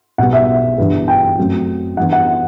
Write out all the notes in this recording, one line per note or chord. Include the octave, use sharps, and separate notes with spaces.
B1 B2 G3 B3 F#5
E5
G1 G2 E3 B3
G5
F#2 F#3 A3 C4
G2 E3 B3 F#5
F#5